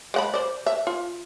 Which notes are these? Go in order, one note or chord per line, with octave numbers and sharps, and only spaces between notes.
G#3 F#5 B5
C5 D5
E5
F4